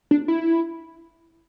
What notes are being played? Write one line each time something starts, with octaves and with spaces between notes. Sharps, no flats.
D4
E4